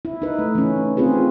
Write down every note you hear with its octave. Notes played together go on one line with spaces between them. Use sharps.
E4
D#4 B4
A3
E3 C#4
C4 F4 G#4 B4